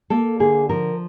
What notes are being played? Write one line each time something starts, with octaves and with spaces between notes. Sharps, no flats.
A#3 A4
D3 G#4
F3 A#4